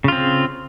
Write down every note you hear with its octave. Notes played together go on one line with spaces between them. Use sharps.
C#3 C4 F4